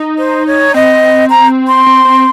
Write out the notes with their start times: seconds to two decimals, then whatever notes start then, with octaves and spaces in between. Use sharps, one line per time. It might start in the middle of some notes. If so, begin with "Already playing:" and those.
Already playing: D#4
0.18 C5
0.47 C#5
0.74 C4 D#5
1.30 A#5
1.68 C6
1.86 C4
2.05 C4